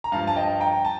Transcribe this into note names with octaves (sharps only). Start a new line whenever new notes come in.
A#5
G2 F3 F5 A5
A5
D#5 G5
G5 A#5
A5